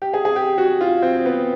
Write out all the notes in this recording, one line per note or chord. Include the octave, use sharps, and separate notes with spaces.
G4
G#4
G#4
G4
F#4
F4
C4
B3